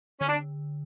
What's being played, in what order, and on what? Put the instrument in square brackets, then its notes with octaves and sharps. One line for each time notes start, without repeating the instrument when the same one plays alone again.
[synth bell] D3 [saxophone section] C#4
[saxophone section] D4